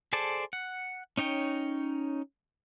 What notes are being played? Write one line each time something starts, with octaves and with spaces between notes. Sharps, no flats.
G#4 A4 C5 D5 A5
F#5
C#4 D#4 C#5 G5